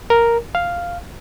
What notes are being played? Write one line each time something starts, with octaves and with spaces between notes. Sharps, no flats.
A#4
F5